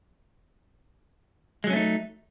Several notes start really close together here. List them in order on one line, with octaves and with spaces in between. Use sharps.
G#3 F#3 C#4 A3 D#4